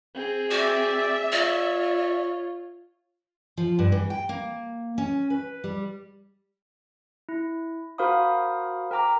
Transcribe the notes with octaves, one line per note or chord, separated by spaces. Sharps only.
C4 G#4
F#4 D5 E5
F4 C#5 D5
F3
G2
E3
G5
A#3
C#4
B4
G3
E4
F#4 A#4 C5 F5 B5 D#6
A#4 G5 A#5 D6